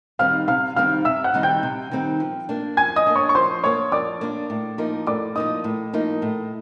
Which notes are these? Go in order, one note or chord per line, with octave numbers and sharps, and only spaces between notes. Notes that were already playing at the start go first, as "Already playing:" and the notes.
D#3 G3 C4 D#4 F5 F6
C3 F5 F6
D#3 G3 C4 D#4 F5 F6
C3 E5 E6
F#5 F#6
D#3 G3 C4 D#4
G5 G6
C3
D#3 G3 C4 D#4
F3
A#3 D4
F3 G#5 G#6
D#5 D#6
A#3 D4
C#5 C#6
C#6
F3 C5 C6
A#3 D4 C#5 C#6
F3 D5 D6
A#3 D4
A2
F3 A#3 D#4
A2 D5 D6
F3 A#3 D#4 D#5 D#6
A2
F3 A#3 D#4
A2